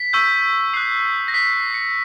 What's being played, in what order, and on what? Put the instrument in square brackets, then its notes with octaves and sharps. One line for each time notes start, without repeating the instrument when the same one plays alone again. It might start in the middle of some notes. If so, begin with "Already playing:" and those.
Already playing: [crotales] B6
C#6 E6 G6
D#6 F#6 C7
A#6
D#6 G6 B6
C7
C#7